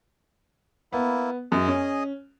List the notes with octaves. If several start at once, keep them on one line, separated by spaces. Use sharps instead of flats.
A#3 B3 E4
F#2 G#4 D#5
C#4